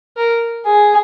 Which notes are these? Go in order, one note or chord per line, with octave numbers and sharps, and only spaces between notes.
A#4
G#4